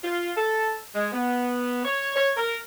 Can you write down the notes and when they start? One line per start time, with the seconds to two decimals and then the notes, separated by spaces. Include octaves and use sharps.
0.03 F4
0.36 A4
0.95 G#3
1.12 B3
1.84 C#5
2.16 C#5
2.37 A#4